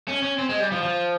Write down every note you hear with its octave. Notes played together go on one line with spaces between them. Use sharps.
C#4
C#4
C4
G#3
G3
F3
F3